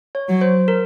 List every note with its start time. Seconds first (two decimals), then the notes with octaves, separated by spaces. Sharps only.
0.15 C#5
0.29 F#3
0.41 C5
0.68 A#4